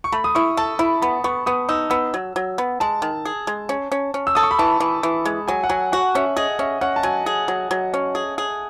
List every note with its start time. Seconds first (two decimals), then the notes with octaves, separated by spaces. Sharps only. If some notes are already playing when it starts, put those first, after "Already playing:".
0.04 C#6
0.12 A3 B5
0.24 D#6
0.35 E4 C#6
0.57 A4 A5
0.79 E4 B5
1.02 B3 B5
1.24 B3 C#6
1.46 B3 D#6
1.69 D#4 E6
1.90 B3 E6
2.14 F#3
2.36 F#3
2.58 B3
2.80 G#3 A5
3.02 D#3
3.25 G#4
3.47 G#3
3.69 C#4
3.92 C#4
4.14 C#4
4.27 E6
4.35 A4 D#6
4.43 C#6
4.51 B5
4.59 E3 A5
4.80 E3
5.03 E3
5.25 G#3
5.48 F#3 G#5
5.64 F#5
5.69 F#3 G#5
5.92 F#4 F#5
6.15 C#4 E5
6.37 G#4 D#5
6.59 C#4 E5
6.81 C#4 F#5
6.96 A5
7.03 F#3 G#5
7.26 G#4
7.48 F#3
7.71 F#3
7.94 C#4
8.15 G#4
8.38 G#4